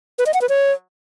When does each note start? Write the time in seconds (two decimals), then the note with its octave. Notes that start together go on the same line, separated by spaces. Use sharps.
0.19 B4
0.26 D#5
0.34 F#5
0.42 B4
0.49 C#5